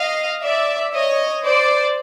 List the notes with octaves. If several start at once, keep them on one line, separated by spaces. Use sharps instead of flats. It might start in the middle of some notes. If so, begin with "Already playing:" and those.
Already playing: D#5 F5
D5 E5
C#5 D#5
C5 D5